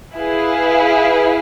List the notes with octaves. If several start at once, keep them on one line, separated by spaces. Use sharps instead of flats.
E4 G#4 B4 F5